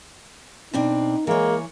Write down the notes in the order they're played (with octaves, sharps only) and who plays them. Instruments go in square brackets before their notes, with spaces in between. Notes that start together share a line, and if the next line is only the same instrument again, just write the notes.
[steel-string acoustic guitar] B2 C4 D4 [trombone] D#4
[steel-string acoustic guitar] E3 C#5 [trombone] G#3 [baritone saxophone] A#3